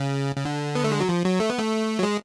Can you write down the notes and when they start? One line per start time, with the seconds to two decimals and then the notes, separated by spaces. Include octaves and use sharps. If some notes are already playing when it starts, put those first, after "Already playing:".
Already playing: C#3
0.36 C#3
0.45 D3
0.75 B3
0.84 A3
0.92 G#3
1.00 F#3
1.09 F3
1.25 F#3
1.40 A3
1.50 B3
1.59 A3
1.99 F#3
2.03 G#3